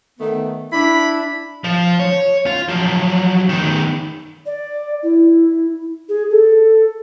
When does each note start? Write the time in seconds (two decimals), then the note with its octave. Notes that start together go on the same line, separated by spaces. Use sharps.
0.19 D#3 A3 B3
0.73 D4 E4 B5
1.64 F3
1.99 C#5
2.46 F4
2.69 F3 F#3
3.49 D#3 B3
4.46 D5
5.03 E4
6.09 G#4
6.31 A4